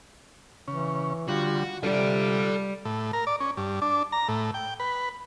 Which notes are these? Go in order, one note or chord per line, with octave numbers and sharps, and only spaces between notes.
C#3 E3 C#4
D3 G3 F4 F#4
C3 G3 F4 A4 D5
A2
A#4
D5
C#4
G2
D4
A#5
A2
G5
B4